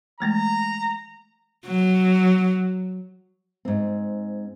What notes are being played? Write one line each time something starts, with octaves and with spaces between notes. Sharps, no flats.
E3 G#3 A3 A#5
F#3
G#2 C4